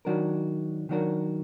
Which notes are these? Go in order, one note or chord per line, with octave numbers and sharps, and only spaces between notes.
D#3 F#3 D4 F#4 A#4
D#3 F#3 D4 F#4 A#4